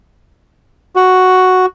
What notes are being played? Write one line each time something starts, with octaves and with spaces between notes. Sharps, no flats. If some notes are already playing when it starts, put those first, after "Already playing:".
F#4